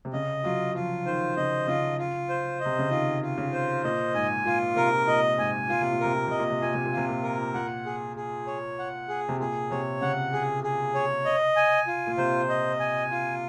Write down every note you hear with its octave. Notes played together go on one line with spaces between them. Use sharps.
C3
C#3 D#5
F#3 F4
F3 F4
D#3 C5
C#3 D#5
C#3 F4
F4
C5
D#5
C3
C#3
D#3 F4
F4
C#3
C5
A#2 D#5
G#2 G#5
A#2 F4
C3 A#4
A#2 D#5
G#2 G#5
A#2 F4
C3
A#2
C3 A#4
A#2
C3 D#5
A#2
C3
A#2 G#5
C3
A#2
C3 F4
A#2
A#4
A#2 F#5
G#4
G#4
C#5
F#5
G#4
C3
A#2 G#4
C3 C#5
C#3 F#5
G#4
G#4
C#5
D#5
G#5
F4
A#2
C3 C5
D#5
G#5
F4